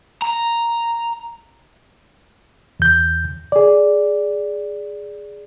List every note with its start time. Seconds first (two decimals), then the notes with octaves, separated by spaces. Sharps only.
0.22 A#5
2.80 E2 G6
3.52 G#4 D5